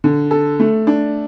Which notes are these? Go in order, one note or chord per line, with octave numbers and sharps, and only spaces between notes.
D3
A4
A3
D4